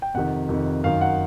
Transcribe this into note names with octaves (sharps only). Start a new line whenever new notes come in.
G5
F2 C3 D#3 F#5
F2 C3 D#3
F#2 D#3 F5
F#5